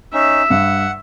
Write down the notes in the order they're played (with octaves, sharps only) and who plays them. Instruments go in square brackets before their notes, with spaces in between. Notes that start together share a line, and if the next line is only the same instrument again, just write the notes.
[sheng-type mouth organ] C#4 D#4 [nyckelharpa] E5
[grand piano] G2 [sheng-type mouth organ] F#5